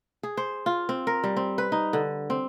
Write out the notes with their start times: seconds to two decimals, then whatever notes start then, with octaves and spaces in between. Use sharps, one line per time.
0.23 G#4
0.37 C5
0.66 F4
0.89 C4
1.07 A#4
1.24 G3
1.37 C4
1.58 B4
1.72 D#4
1.93 D3
2.30 C4